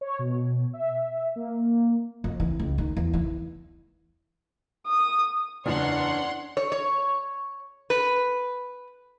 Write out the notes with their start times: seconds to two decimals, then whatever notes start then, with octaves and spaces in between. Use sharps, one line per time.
0.01 C#5
0.19 B2
0.73 E5
1.36 A#3
2.24 F2
2.40 E3
2.60 C#2
2.78 D#3
2.97 E2
3.13 E3
4.87 D#6
5.66 F#1 E2 D4 C#5 F#5 C6
6.57 C#5
6.72 C#5
7.90 B4